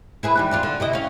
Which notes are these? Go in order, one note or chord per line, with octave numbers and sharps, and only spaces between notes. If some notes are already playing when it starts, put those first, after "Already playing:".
E4 G#4 B4
D#2 E3 G3
E2 D4 F4
D3
C3 E4 D#5
C#4 F5